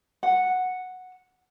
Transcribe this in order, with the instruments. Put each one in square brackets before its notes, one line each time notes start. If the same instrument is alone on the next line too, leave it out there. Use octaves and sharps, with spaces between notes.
[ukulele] F#5